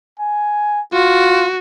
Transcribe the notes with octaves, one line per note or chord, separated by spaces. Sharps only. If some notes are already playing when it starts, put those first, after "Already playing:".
G#5
F4 F#4